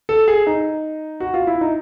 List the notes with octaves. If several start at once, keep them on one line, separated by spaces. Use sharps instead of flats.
A4
G#4
D#4
F#4
F4
E4
D#4